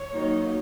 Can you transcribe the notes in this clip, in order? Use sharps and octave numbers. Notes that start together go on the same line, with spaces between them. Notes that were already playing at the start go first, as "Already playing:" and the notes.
Already playing: C#5
D#3 F#3 A#3 D#4